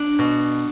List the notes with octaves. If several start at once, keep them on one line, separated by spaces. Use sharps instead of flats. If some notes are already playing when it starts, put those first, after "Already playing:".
Already playing: D4
B2